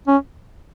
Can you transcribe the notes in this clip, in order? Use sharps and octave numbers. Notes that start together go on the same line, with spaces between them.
C#4